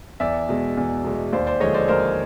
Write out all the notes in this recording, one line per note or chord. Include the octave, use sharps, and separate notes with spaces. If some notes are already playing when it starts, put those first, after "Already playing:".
E2 D5 E5
B2 G#3
E2
B2 G#3
D#2 C5 D5
C5 D5
D3 F3 G#3 C#5 D#5
C5 D5
D#2 A#4 C5